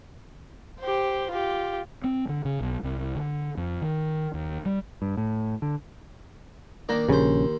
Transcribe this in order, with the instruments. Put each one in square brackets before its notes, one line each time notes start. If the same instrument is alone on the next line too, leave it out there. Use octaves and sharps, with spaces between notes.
[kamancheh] G4 C5
F4 G4
[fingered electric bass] C4
D3
C#3
B1
C2
D3
F2
D#3
D#2
G3
[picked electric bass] G2
A2
D3
[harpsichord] D#3 A#3 D4
[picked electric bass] A#1 C#3 [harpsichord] D#2 C5